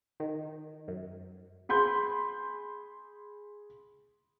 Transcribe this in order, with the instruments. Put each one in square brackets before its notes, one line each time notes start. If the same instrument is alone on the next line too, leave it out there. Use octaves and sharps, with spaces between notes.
[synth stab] D#3
F#2
[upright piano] G#4 B5 C6 G6